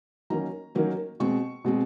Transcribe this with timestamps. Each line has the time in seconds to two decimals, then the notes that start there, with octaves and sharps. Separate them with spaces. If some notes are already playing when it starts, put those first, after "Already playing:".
0.30 D#3 F#3 A#3 C#4 A#5
0.75 D#3 F#3 A#3 C#4
1.20 B2 G#3 C4 C#6
1.64 B2 G#3 C4